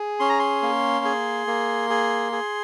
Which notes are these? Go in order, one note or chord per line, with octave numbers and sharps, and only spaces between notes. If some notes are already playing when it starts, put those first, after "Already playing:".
Already playing: G#4
C#4 C6
A#5
C6
A#3
G#4
A#3
G#4
G#4